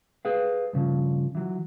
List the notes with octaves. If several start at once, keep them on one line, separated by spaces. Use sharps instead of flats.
G#4 B4 F5
G2 C#3 F3
E3 F#3